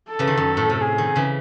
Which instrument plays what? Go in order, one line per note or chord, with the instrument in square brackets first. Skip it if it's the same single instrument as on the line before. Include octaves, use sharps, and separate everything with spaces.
[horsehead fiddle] A4
[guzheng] C#3 E3
D#3
F#2
A2
C3
[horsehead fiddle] G#4
[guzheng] D#3
C#3 E3